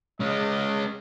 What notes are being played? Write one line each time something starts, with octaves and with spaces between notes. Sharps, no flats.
G#3 C#4 D#5